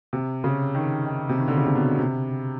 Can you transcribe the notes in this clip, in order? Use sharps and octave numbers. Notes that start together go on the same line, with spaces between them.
C3
C#3
D#3
D#3
C3
D#3
D3
C#3
C3
B2
C3